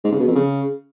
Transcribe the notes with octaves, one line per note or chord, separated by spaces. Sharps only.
G#2
C#3
B2
F2
C#3